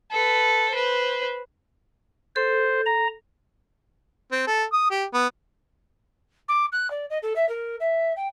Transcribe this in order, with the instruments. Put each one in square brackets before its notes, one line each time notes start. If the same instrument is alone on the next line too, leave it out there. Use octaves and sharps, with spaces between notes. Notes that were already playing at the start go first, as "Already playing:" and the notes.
[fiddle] A4 B4
B4 C5
[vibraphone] A4 [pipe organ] C5
[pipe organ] A#5
[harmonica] C4
A4
D#6
G4
B3
[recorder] D6
F#6
D5
D#5
A4
E5
A#4
E5
G5